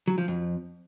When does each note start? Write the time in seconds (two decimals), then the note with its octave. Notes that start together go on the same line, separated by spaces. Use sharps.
0.08 F#3
0.18 F3
0.28 F2